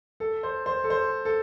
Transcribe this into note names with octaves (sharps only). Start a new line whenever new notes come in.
A4
C5
C5
A4
C5
A4